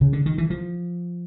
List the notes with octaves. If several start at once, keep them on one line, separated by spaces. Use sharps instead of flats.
C#3
D3
D#3
E3
F3